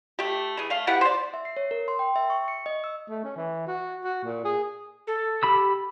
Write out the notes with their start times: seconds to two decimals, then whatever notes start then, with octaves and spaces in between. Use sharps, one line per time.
0.19 A3 G4
0.57 E3 G#4
0.70 A3 F5
0.87 B3 E4 G4 F#5
1.01 C5 D5
1.34 E5
1.45 C7
1.57 C#5
1.71 A#4
1.88 C6
1.99 G5
2.16 E5
2.30 C#6
2.48 C#7
2.66 D#5
2.84 E6
3.09 A3
3.24 C#4
3.37 E3
3.67 F#4
4.04 F#4
4.24 A#2
4.45 G#4
5.07 A4
5.43 G4 B5 E6